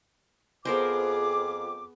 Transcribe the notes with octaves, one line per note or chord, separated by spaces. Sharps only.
F2 B3 G#4 A#4 C5 D6